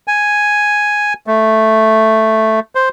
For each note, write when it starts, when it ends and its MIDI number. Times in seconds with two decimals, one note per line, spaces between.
0.08 1.13 80
1.27 2.60 57
2.75 2.89 72